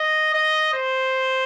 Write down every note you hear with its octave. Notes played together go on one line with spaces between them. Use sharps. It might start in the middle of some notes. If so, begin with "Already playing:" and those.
Already playing: D#5
D#5
C5